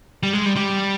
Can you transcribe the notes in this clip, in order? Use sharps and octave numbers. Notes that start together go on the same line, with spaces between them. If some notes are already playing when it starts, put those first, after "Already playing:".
G3
G#3
G3
G3